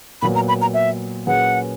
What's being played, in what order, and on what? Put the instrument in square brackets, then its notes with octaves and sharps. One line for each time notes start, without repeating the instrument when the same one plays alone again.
[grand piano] A#2 F#3 B3 [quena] B5
[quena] A#5
B5
A#5
E5
[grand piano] A#2 F#3 C#4 G#4 B4 [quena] F#5